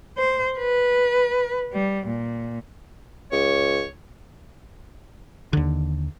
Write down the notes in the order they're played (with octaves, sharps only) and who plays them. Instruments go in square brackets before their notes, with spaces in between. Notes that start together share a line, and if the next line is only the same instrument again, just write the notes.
[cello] C5
B4
G3
A#2
[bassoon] C#2 [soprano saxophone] C#5
[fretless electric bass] D#2 D3